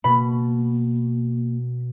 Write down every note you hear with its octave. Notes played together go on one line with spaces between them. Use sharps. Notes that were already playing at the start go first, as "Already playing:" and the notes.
B2 A#3 B5